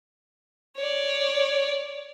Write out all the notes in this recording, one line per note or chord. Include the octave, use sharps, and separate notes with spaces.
C#5 D5